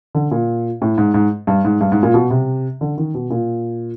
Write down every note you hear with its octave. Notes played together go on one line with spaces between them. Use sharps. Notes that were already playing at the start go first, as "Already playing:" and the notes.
D3
A#2
A2
G#2
G#2
G2
G#2
G2
G#2
A#2
B2
C3
D3
D#3
B2
A#2